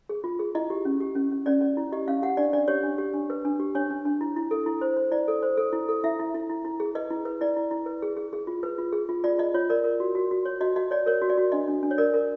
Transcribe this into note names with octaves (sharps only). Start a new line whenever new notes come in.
G#4
F4
G#4
E4 D#5
G4
C#4
G4
C#4
C#4
C#4 D5
C#4
E4
G4 D#5
C#4 F5
G4 F#5
D4 D5
D4 D5
G4 C#5
D4
G4
D4
B4
D4
G4
D4 C#5
D4
D4
E4
E4
A4
E4
C5
C5
E4 D5
A4
C5
A4
E4
A4
E4 E5
E4
E4
E4
E4
G#4
B4 D#5
E4
B4
E4 D5
E4
E4
B4
G#4
G#4
G#4
F4
B4
F4
G#4
F4
F4 D5
F4 D#5
F4 C#5
A#4 D5
A#4
F#4
F#4
F#4
C#5
F#4 D#5
F#4 D#5
C#5 D5
A#4 C#5
F#4
D5
F#4
D4 D#5
D4
D4
C#5
A#4 D5
A#4